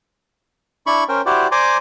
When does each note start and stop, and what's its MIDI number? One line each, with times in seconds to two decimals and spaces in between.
0.87 1.04 62
0.87 1.04 64
0.87 1.04 83
0.87 1.04 85
1.09 1.22 61
1.09 1.22 70
1.09 1.22 72
1.09 1.22 79
1.26 1.47 64
1.26 1.47 66
1.26 1.47 67
1.26 1.47 72
1.26 1.47 74
1.52 1.77 72
1.52 1.77 74
1.52 1.77 80
1.52 1.77 82
1.52 1.77 84
1.52 1.77 86